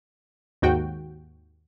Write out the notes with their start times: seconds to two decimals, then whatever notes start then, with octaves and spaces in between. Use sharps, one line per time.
0.62 D#2 G#2 F#4 G5